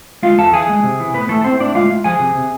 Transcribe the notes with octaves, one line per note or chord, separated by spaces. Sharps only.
G#3 F4 F5
E2 A4 A5
E3 G#4 G#5
G#3
C3
E3
A2 B3 B4
E3 A3 A4
A2 C4 C5
A2 D4 D5
G#3 F4 F5
G#3
F3 G#4 G#5
C3
C3